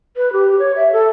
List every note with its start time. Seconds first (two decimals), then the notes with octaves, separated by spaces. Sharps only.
0.17 B4
0.33 G4
0.59 C#5
0.76 E5
0.93 A4